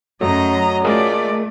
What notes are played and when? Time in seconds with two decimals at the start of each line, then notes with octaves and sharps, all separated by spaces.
0.21 F#2 F#3 A3 D#5 A#5
0.84 A3 F4 G#4 A#4 D5 D#5